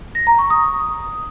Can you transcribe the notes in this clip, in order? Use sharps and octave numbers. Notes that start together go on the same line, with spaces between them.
A#6
A#5
C#6
D#6